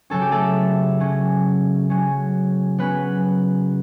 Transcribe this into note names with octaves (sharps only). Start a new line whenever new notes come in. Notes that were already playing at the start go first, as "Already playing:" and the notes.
C#3 F#3 C#4 A4
G4
A3 A4
C#3 F#3 C#4
C#3 F#3 C#4
C#3 F#3 B3 C#4 B4